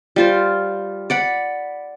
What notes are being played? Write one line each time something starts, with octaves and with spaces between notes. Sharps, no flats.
G3 F4 C5
D5 F#5 B5